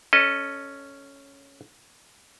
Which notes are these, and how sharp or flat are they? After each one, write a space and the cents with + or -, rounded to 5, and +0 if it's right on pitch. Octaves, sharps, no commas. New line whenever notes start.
C#4 +0 A4 +0 D#5 -20